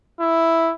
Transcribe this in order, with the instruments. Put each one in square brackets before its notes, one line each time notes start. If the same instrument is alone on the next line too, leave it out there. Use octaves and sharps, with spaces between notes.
[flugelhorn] E4